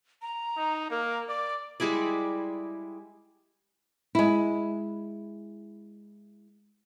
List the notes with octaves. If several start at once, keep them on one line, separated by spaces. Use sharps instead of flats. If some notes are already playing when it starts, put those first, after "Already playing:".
A#5
D#4
A#3 A#4
D5 D6
G3 G#3 E4 D5
G#3 E4